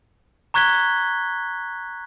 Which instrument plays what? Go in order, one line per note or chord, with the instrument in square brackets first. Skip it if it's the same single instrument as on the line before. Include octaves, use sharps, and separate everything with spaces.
[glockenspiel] A#5 C#6 F#6 G#6 B6 G7